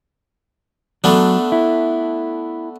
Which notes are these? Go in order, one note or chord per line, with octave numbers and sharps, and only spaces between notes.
F#3 A3 B3 D4
E4